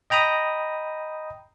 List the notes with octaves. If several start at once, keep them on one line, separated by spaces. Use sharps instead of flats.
D#5 G5 A#5 B5 D#6